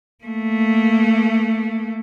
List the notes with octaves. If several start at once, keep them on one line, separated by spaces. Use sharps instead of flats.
A3 A#3